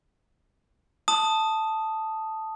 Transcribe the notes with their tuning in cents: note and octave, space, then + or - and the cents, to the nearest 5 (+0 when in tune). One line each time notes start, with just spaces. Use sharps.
A5 +0 D#6 +0